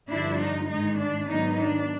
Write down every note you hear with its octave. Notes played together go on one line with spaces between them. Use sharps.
G2 D3 F3 D4 E4
D#4
G#2 D#3 G#3 D#4
D4
G#2 D#3 F#3 B3 D4 D#4
D4